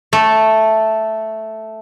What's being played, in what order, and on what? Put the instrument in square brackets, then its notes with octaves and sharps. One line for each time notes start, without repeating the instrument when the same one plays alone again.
[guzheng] A3